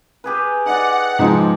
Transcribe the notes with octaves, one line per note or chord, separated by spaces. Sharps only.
G4 G#4 B4
D#4 D5 F#5
G#2 F3